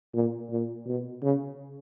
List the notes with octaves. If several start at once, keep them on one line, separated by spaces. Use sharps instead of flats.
A#2
A#2
B2
C#3